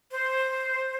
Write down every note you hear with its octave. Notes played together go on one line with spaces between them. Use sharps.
C5